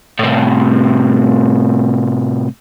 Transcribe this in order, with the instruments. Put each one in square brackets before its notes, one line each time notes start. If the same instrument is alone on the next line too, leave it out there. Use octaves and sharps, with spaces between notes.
[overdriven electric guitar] A2 C3